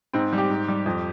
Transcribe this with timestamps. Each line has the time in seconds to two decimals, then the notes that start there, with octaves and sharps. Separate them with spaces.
0.13 G#2 C4
0.33 G3
0.38 G4
0.50 G#2
0.68 G3
0.86 F2